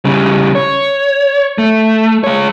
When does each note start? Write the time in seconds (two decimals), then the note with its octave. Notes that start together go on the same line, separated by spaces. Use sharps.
0.05 C#3 G3
0.55 C#5
1.58 A3
2.24 G#3 C#5